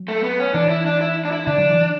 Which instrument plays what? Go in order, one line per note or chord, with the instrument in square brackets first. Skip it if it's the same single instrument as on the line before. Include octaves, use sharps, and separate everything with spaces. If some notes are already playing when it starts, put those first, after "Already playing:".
Already playing: [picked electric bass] F#3
[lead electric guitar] A3
B3
C#4
[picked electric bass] E3 [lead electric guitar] D4
[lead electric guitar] E4
D4
E4
D4
E4
[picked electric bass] D3 [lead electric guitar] D4
[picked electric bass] F#3
E3